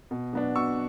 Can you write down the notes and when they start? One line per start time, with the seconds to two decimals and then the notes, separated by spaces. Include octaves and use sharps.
0.11 B2
0.33 F#3 B3 D4
0.55 B2 C#6 E6